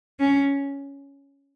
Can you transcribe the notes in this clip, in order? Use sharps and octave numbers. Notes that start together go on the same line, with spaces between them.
C#4